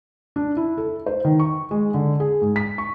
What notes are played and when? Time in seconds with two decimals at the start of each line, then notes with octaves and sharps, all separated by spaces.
0.36 D4
0.57 E4
0.77 A4
1.06 C5
1.25 D#3
1.40 C#6
1.71 G#3
1.94 D3
2.20 G#4
2.41 G#2
2.56 B6
2.78 C#6